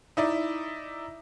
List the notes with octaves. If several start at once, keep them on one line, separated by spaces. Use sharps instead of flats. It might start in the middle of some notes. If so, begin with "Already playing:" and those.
D#4 E4 D5